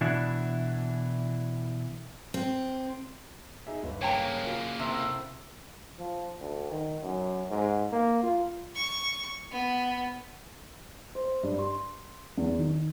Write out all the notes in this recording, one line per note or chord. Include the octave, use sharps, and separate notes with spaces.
B2 E3 D4 E4
C4
D#4 G#4 E5
G1 B4
C#3 A#3 C#5 G5 A#5
F4 A#4
A2 C3
F3
D2
D#3
F#2
G#2
A#3
F4
C#6
B3
C5
G2
C6
E2
D#3